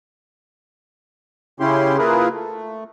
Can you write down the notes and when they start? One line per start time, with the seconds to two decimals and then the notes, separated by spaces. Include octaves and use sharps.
1.60 C#3 C#4 E4 G4 C6
1.98 A#3 E4 F4 G#4 A#4 B4
2.33 A3